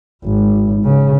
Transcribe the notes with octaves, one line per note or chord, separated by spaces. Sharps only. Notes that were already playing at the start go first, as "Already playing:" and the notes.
G#1
C#3